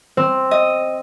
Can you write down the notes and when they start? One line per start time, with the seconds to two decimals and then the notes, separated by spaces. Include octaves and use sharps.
0.17 C4
0.51 D#5